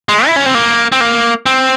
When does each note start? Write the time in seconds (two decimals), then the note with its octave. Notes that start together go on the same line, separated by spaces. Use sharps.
0.09 G#3
0.27 E4
0.36 C#4
0.46 C4
0.54 A#3
0.92 C4
1.01 A#3
1.46 C4